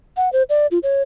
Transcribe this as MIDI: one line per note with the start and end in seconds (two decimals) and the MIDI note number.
0.17 0.32 78
0.33 0.43 72
0.49 0.67 74
0.71 0.79 65
0.83 1.02 73